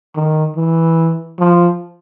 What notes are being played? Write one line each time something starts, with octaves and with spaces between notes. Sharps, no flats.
D#3
E3
F3